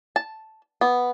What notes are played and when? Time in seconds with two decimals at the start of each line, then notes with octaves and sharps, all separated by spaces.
0.16 A5
0.81 B3